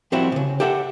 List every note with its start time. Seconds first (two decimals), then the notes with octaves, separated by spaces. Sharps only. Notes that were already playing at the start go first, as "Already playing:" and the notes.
0.12 F3 G3 C4 E4 F#4 E5
0.32 C2 C#3
0.60 G4 A4 E5 F#5 G5